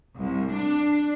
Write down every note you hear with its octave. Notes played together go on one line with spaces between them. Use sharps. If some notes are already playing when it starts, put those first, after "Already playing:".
C2
D4